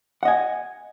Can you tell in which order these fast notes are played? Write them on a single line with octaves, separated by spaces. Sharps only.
F#5 D#5 G#5